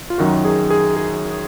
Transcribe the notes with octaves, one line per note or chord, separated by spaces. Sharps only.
F4
F#2 D#3 F#3 F#4
G#4
G#4
G#4